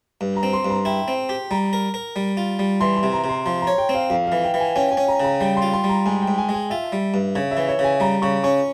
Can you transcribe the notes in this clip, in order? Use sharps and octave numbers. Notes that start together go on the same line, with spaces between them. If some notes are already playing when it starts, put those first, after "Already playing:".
G2
A#5
C4
C6
G2
A#5
E4 G5
C4
G4
G3 A#5
A#4
A#4
G3
F4
G3
E3 C6
C6
C3
A#5
C3
C6
F3 C6
A#5
C#5
G5
C4
F5
F2 F5
E3 F5
G5
E3
G#5
C#4 G5
G#5
C#4
A#5
C#3 A#5
G3 G5
C6
F4
C6
G3
A#5
G#2 G#5
G5
G#2
G#5
G#3
G#5
F4 E5
G3
G2
C#3 C#5
E5
E3
C#5
C#3
G#5
G3 A#5
C#3 C#6
C#4 C#6